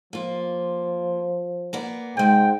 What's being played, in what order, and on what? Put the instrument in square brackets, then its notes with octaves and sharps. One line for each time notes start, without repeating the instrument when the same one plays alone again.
[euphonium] F3 [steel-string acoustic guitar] A#3 F4
[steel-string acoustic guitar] A#3 B3 D5
[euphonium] G#2 [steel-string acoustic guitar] C3 G#3 [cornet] G5